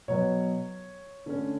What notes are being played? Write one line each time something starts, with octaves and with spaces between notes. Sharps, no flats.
B2 F#3 B3 C#5
D3 A3 C#4